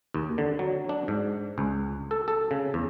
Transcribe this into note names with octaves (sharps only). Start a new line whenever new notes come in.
D#2
D3
F#3
D4
G#2
C#2
A4
A4
C#3
E2